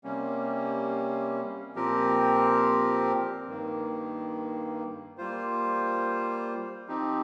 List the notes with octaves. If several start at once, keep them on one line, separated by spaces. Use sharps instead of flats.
C3 G3 A#3 C#4
A#2 F3 C4 G4 A#4
G2 D#3 A#3
G3 A#3 F4 C5
F3 C4 D#4 G4